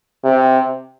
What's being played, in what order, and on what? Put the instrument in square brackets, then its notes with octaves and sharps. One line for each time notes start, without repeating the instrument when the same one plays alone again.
[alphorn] C3